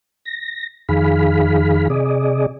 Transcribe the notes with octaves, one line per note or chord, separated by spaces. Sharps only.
A#6
F2 D#3 G#4 F5 B5
C3 G#4 D5 D#5